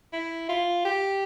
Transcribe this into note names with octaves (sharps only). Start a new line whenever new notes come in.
E4
F4
G4